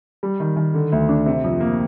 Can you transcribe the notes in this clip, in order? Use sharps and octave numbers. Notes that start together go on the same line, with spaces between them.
G3
D#3
D#3
D3
D2
D4
C3
F2
A#3